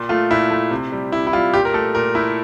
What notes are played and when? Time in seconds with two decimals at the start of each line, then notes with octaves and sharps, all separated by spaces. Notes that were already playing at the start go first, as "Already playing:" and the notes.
Already playing: A#2
0.09 A3 F4
0.30 A#2 E4
0.51 A3
0.71 C3
0.92 G3
1.12 C3 E4
1.27 E4
1.33 G3 F4
1.54 A#2 G4
1.65 A#4
1.74 A3 A4
1.95 A#2 A#4
2.15 A3 E4